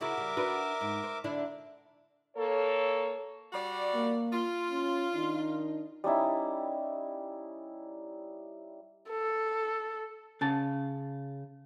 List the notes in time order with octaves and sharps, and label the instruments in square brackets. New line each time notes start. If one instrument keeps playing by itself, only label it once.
[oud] C#3 E4 F#4 [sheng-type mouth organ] A#4 E5 D6
[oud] C#3 G3
D4 F#4 B4
G#2
C5
D3 D4 E4
[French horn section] A#3 A4 C#5
[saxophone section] G3 F#4 D5
[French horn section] A#3
[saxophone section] F4
[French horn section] C#4
D#3 D4 D#4
[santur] G3 C#4 D#4 E4
[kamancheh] A4
[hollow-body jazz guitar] C#3 A5